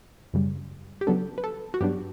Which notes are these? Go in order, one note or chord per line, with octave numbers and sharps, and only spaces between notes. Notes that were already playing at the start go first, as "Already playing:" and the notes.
F#2 C#3 G3
G4
C#3 F#3 B3 D4 A4
B4
A4
F#4
G2 F#3 B3 D4 G4